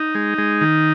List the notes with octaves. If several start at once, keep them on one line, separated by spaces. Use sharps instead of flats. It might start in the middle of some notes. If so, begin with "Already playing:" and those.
Already playing: D#4
G#3
G#3
D#3